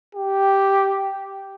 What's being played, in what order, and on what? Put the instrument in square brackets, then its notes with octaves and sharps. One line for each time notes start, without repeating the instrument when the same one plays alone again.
[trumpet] G4